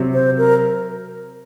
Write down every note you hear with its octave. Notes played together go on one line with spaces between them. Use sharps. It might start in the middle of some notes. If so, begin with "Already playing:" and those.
Already playing: C3 F#3 C4
C5
A#4